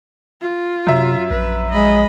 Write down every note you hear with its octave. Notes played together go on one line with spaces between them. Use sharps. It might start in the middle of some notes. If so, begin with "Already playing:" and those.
F4
F#2 C3 E5
A#1 B4
G#3 D#5 B5